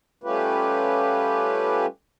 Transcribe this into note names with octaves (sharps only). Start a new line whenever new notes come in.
G3 A3 C#4 F4 G4 B4